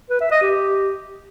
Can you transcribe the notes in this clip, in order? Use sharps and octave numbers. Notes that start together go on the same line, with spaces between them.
B4
E5
D#5
G4